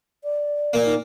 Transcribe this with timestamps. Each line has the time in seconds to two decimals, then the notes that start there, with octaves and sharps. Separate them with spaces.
0.24 D5
0.73 A#2 A#3
0.86 D#4